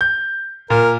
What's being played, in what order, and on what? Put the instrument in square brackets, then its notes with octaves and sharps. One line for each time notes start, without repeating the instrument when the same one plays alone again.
[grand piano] G6
[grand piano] A#2 [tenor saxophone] A#4